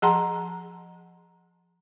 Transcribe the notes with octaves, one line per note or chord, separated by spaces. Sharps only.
F3 G#4 F#5 A5 A#5 C6